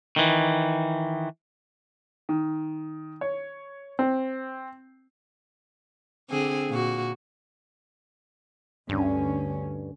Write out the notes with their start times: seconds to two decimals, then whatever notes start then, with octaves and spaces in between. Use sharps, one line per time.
0.16 D#3 E3
2.29 D#3
3.21 C#5
3.99 C4
6.29 D3 C4 G#4
6.69 A#2 F#4
8.89 D2 G2 D3 C#4